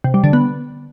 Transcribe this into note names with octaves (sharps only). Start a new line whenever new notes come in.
C3
G3
D3
B3